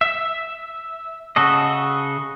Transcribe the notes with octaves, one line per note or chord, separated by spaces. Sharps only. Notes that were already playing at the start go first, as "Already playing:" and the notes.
E5
C#3 F#4 A4 D#5